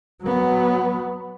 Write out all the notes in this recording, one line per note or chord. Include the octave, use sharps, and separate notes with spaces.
F#3 B3